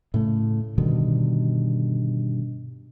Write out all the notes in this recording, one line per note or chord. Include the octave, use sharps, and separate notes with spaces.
A2 C#3 A3
G2 B2 D3 D#3